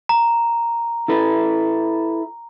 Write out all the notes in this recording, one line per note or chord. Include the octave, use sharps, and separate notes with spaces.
A#5
E4 A4 B4